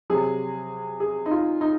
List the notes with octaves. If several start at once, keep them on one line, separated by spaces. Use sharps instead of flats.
C3 F#3 G#4
G#4
D#4
F4
D#4